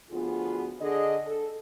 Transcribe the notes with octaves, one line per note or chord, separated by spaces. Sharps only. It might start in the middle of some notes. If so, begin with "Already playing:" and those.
D2 F3 B3 F4 F#4 G#4
D3 G#4 D#5
A4